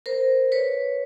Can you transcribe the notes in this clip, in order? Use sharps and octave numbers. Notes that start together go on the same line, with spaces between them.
A#4 C5
B4 C#5